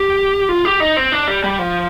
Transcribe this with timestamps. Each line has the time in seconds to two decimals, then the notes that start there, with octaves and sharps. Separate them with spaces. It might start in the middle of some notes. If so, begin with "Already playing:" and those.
Already playing: G4
0.49 F4
0.65 G4
0.80 D#4
0.97 C4
1.12 D4
1.28 G3
1.44 G3
1.59 F3